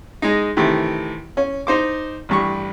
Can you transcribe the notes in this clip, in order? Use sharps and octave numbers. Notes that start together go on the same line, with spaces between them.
G#3 D#4
C3 D#3 E3 A3
C#4
D#4 C5 D6
A1 G2 C#6